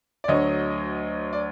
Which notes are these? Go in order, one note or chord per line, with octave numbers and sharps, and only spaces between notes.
D5
D2 D3 F#3 C#5 D#5
D5